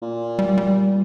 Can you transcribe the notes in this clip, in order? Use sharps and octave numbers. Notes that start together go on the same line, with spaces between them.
A#2
G3
G3